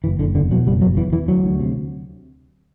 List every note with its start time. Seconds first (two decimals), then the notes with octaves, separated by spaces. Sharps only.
0.04 F#1 E3
0.19 F#1 D3
0.35 E2 D3
0.51 B2 F#3
0.67 F#1 G3
0.81 E2 F#3
0.97 E2 E3
1.12 E2 E3
1.28 D2 F#3
1.44 D2
1.60 C3